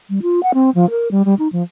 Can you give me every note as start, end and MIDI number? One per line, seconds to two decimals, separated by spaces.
0.10 0.19 55
0.22 0.42 65
0.43 0.52 78
0.54 0.70 60
0.75 0.89 53
0.90 1.11 70
1.11 1.22 55
1.25 1.34 55
1.39 1.48 63
1.52 1.63 53